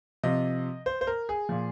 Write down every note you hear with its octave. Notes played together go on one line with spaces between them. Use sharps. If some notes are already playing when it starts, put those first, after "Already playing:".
C3 F3 D#5
C5
C5
A#4
G#4
A#2 F3